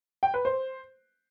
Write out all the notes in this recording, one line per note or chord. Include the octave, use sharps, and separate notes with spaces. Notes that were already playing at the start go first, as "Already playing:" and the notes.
G5
B4
C5